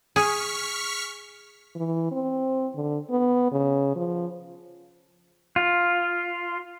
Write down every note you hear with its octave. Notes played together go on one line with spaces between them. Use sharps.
G#4 C#6 F6 B6
E3
C4
D3
B3
C#3
F3
F4